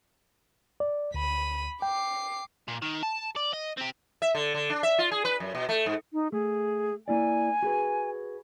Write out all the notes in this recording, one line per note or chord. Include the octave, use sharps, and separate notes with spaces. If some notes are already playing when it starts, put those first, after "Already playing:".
D5
D2 B5 D#7
G5 D6 C7
A#2
D#3
A5
D5
D#5
C4 G4
E5
D3
D3
D4
E5
F4
G#4
B4
F#2
B2
A3
G#2
D#4
A3 G#4
A#3 E4 D5 G#5
F#4 G#4 B4